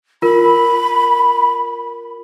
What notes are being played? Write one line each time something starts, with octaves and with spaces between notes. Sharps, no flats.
F4 A#4 B5